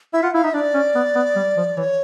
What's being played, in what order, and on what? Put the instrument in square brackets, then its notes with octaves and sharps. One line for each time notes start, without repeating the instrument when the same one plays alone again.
[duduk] E4 [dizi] E5
[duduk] F4 [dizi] F#5
[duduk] E4 [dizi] F5
[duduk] D#4 [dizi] E5
[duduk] D4 [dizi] D5
[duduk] C#4
B3
B3
G3
F3
[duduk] E3 [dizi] C#5